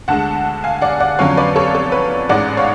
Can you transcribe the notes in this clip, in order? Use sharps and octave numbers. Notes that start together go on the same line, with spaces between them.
D2 D3 G#3 F#5 A5
F5 G#5
D5 F#5
D5 F#5
F2 D3 F#3 C#4 F4 C#5 F5
B4 D5
A4 C#5
A4
B4
A1 G#2 G#3 D5 F#5
C#5 F5